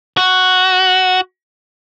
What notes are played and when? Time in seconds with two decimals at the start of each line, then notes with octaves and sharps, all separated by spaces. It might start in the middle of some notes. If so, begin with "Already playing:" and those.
0.17 F#4